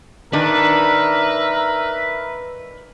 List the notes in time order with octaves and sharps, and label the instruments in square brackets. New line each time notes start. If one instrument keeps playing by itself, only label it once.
[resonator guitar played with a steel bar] D#3 D4 [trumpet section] A#4 E5 [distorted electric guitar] B4